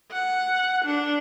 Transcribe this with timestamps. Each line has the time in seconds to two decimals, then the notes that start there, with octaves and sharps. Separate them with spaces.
0.11 F#5
0.85 D4